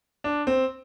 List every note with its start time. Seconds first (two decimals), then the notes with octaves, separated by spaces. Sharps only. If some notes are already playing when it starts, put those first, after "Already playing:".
0.24 D4
0.47 C4